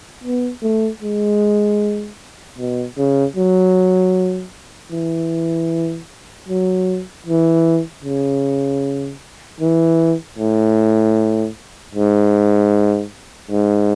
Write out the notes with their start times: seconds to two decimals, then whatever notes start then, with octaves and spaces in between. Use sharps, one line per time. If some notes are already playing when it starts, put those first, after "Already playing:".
0.24 B3
0.63 A3
1.02 G#3
2.58 B2
2.97 C#3
3.36 F#3
4.91 E3
6.48 F#3
7.26 E3
8.04 C#3
9.60 E3
10.38 A2
11.95 G#2
13.51 G#2